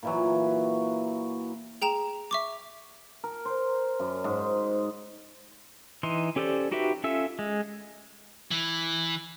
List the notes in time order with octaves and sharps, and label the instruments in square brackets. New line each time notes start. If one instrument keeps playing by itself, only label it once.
[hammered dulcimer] A#2 E3 F#3
[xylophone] G#4 G5 A#5 E7
E5 C#6 D6
[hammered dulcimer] A#4
C5
F#2
G#2
C5
[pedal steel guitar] E3 D#4 C6
C#4 G4 A4 C5 D5
D#4 F#4 G4 B4 E5
C#4 F4 A4 E5 E6
G#3
[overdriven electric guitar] E3